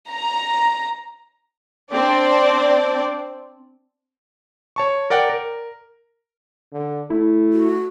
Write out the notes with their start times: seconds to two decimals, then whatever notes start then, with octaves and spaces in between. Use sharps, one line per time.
0.11 A#5
1.92 C4 D4 D5
4.76 C#5 A5 C#6
5.10 A#4 D5 F#5 G5
5.30 A#4
6.72 D3
7.10 A3 E4
7.53 F#4